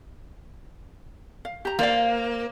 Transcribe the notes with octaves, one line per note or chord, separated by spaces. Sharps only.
F5
G4 A#5
A#3 C5 D5 F5